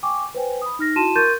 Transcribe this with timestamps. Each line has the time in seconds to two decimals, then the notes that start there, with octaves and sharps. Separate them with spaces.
0.03 G5 G#5 C#6 D6
0.35 B4 C5 G5 G#5
0.62 B5 D#6
0.79 D#4 F6 A#6
0.96 E4 F#4 A5 C6 D#7 E7
1.15 A#4 C6 C#6 G6 A6 D#7